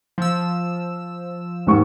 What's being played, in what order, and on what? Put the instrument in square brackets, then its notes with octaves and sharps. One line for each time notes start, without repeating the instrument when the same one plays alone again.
[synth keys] F3 E6
[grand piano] D#2 G#2 C#6